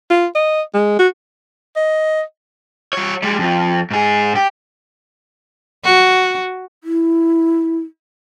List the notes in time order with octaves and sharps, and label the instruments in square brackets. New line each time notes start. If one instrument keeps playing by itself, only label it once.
[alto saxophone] F4
D#5
G#3
F#4
[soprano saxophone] D#5
[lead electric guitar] G3 C#5
G3 G#3
F2 F3
G#2 G#4
G4
[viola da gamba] F#4
[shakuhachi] E4